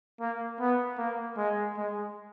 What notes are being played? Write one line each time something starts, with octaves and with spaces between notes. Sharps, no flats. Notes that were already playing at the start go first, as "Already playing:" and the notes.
A#3
B3
A#3
G#3
G#3